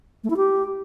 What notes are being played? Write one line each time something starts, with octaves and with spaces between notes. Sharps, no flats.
A3
E4
G4